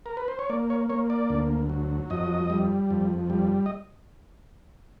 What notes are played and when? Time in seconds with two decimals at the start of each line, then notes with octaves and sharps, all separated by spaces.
0.06 A#4
0.17 B4
0.28 C5
0.39 C#5
0.50 A#3 D5
0.70 C#5
0.89 A#3 C#5
1.10 D5
1.30 D2
1.69 F#3
2.10 F2 D#5
2.50 G3
2.91 F2
3.30 G3
3.66 D#5